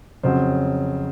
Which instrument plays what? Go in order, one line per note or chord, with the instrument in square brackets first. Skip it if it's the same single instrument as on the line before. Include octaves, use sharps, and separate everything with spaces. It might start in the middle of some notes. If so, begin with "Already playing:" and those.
[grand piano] F2 C#3 F#3 C5